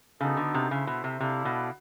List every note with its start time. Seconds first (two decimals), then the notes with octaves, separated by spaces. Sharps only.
0.20 C#3 B3 D#4 F#4 A4
0.37 D3
0.54 C3
0.70 C#3 E4 A4 C5 E5
0.87 B2
1.04 C3
1.20 C3 E4 A4 D5 F5
1.45 B2